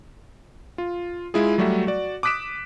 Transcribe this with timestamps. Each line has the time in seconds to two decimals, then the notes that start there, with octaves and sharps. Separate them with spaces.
0.78 F4
1.34 G#3 E4 F4 G#4
1.58 F#3 G3 A3 F#4 E5
1.87 F#4 D5
2.23 D6 D#6 F#6 B6 D7 E7